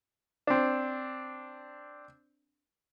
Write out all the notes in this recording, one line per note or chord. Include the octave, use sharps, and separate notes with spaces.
C4 D4